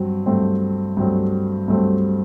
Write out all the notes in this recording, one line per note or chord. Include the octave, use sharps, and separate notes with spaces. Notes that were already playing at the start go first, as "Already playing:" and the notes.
Already playing: G2 F#3 C4
G2 F#3 A3 C4
G2 F#3 A3 C4
G2 F#3 A3 C4